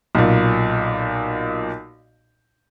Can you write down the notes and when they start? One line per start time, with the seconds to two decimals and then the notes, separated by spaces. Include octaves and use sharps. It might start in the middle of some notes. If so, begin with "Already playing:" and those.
0.15 B1 A#2